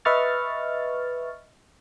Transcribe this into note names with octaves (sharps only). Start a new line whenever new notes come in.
B4 D#5 E5 C#6 F6 A6